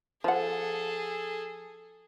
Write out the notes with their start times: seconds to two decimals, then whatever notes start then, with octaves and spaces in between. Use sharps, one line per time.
0.24 F3 G#4 A4 F#5